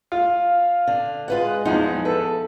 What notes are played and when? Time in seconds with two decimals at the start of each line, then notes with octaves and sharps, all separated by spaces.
0.12 F4
0.41 F5
0.87 D3
1.28 G#3 F4 B4 F#5
1.65 E2 F3 D#4 F#5
2.05 A4 B4